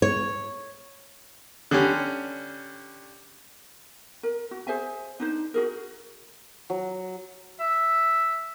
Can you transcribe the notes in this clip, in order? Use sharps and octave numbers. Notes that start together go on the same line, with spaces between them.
C#5
D3 G3 C#4
A#4
F#4
G#4 C5 E5 G#5
D4 D#4 C5
F#4 G#4 A#4
F#3
E5